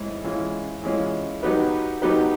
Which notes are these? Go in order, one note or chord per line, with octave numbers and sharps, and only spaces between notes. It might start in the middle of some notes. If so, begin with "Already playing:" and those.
Already playing: G#2 E3 G#3 C#4
E3 G#3 C#4 F4
E3 G#3 C#4 F4
F#3 B3 D#4 G4 B4
F#3 B3 D#4 G4 B4